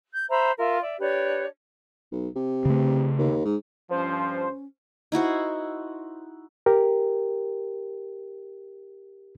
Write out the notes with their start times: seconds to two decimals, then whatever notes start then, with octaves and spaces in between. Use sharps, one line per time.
0.13 G6
0.29 C5 E5 A#5 B5
0.58 F4 A#4 E5
0.81 D5 E5
0.99 D4 G4 B4 C#5
2.12 B1
2.36 C3
2.65 C#3 A3
3.18 D#2
3.45 G#2
3.91 G2 F3 C#4 C5
5.12 D#4 E4 F#4 C5
6.66 G4 A#4